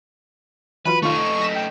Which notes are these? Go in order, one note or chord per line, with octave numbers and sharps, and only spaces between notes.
E3 F#3 F4 B4 B5
D#3 A3 D#4 F4 C#6
E7
A#6 B6 E7
G5